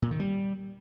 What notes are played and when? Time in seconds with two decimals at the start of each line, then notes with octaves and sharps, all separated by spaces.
0.02 A#2
0.11 D#3
0.20 G3